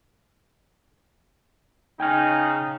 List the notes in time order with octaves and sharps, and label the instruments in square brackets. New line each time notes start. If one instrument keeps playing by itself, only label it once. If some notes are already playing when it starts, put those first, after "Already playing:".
[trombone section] C#3 D#4 [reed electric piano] G5 G#5 F6